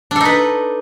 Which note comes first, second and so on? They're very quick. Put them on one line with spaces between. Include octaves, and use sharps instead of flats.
D4 A4 D#4 B4